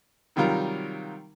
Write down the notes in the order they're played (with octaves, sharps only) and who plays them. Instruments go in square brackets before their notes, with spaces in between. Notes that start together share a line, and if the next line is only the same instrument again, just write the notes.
[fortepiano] C3 D#3 F#3 G3 F4 A#4